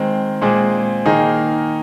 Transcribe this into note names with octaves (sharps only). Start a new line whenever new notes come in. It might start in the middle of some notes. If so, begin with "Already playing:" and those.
Already playing: D#3 G#3 C4
A#2 G#3 C4 G#4
D#3 A#3 D#4 G#4